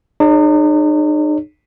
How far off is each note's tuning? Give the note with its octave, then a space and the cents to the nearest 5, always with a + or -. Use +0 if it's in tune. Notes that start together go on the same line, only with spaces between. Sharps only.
D#4 -40 G#4 +0 C#5 +0